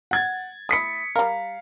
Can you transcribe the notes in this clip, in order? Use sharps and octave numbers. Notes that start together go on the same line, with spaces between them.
F#5 G#6 A6
A3 E4 D#6 B6 C#7
G3 A#4 F5